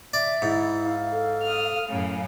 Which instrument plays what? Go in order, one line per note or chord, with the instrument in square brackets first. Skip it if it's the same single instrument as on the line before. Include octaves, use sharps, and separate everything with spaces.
[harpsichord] D5 [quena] E5
[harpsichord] G#2 [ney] E4
[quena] F5
[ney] A4
[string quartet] D#6 F6
F#2 A2 C#3